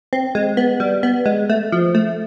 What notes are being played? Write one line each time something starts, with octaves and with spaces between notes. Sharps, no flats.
C4
G#3
B3
G3
B3
G#3
A3
F3
A3